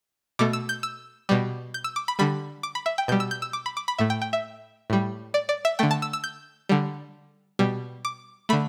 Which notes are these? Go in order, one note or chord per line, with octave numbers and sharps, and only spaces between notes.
B2 A3 D6
E6
G6
E6
B2 G3
G6
E6
D6
B5
D3 G3 B5
D6
B5
E5
G5
B2 G3 G6
E6
G6
E6
D6
B5
D6
B5
A2 A3 E5
G5
G5
E5
A2 G3
D5
D5
E5
D3 A3 G5
A5
E6
E6
G6
D3 G3
B2 G3
D6
D3 A3 B5